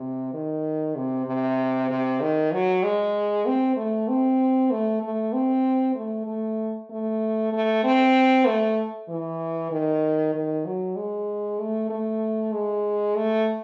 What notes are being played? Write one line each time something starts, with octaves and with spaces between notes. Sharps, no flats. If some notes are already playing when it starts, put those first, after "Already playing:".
Already playing: C3
D#3
C3
C3
C3
D#3
F#3
G#3
C4
A3
C4
A3
A3
C4
A3
A3
A3
A3
C4
A3
E3
D#3
D#3
F#3
G#3
A3
A3
G#3
A3